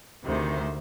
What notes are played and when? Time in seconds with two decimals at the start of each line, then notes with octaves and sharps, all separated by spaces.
0.24 D2 C3 D#3 C5